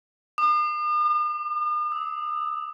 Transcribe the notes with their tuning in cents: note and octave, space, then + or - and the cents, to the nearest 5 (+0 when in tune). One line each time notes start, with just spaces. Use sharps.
D#6 -45
D6 +25
E6 -45